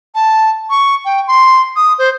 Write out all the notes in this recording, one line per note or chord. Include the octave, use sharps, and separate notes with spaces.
A5
C#6
G5
C6
D#6
C5